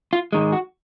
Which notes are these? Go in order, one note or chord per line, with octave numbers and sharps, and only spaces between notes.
F4
G#2 D#3 G#3
F#4